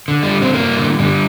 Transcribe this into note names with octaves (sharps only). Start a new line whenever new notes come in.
D3
G3
G2
C4
G2 A#3
D3
D3 G3